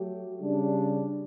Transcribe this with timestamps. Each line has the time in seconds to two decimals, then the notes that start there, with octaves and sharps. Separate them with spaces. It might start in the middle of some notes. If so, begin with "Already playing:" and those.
Already playing: F#3 A3 G4
0.41 C#3 G3 D4